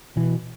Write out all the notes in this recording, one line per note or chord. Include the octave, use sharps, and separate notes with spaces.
B2 E3